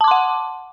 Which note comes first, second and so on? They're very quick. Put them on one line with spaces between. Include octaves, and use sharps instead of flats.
A5 D6 C6 F#5